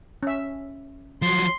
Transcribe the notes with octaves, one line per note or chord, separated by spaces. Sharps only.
C#4 E5
F3 F#3 C6